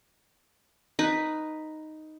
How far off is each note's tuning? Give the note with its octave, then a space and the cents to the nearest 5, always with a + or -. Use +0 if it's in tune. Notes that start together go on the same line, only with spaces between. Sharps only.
D#4 +0 B4 +0